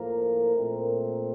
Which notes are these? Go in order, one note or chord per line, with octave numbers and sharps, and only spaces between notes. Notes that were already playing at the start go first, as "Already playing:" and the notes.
Already playing: A2 F3 A#3 A#4
A#2 A3 C4